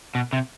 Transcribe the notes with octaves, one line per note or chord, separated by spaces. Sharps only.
B2
C3